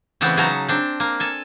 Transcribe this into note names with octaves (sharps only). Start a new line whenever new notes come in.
C#3 E3 A3 B3 C4
C#3 F#3 C#4 D#4 A5 A#5
C4 D4
A#3
A4 G#5